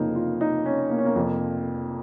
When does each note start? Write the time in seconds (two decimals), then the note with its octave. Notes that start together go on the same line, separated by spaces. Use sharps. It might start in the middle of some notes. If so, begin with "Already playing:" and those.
Already playing: F1 F2 C#3 F3 A#3 D#4
0.15 F4
0.41 D#4
0.66 C#4
0.90 A#3
0.98 C#4
1.05 A#3
1.15 F1 F2 F3